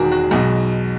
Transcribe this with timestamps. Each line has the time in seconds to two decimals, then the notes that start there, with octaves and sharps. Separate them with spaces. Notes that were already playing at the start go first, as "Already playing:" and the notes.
Already playing: E1 E2 D#3 G#3 F#4 G#4 A#4
0.12 F#4
0.31 B1 B2 G#3